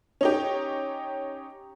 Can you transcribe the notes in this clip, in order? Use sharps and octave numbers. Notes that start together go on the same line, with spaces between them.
C#4 D#4 G4